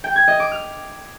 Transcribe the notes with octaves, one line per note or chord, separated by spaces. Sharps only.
G5
G#6
D#5
D6
F6